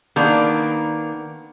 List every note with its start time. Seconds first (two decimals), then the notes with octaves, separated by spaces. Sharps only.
0.16 D#3 A#3 B3 D4 A#5